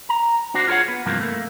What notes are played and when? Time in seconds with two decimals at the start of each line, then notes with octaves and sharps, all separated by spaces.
0.09 A#5
0.54 D4 F#4 C5
0.67 F4 G#4 A#4 C#5 F#5
0.88 B3
1.06 G2 C3 E3 F3 A#3
1.21 A3 A#3